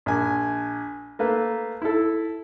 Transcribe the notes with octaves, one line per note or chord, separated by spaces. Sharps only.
A#1 G#5
A3 A#3 B4 F5
E4 A4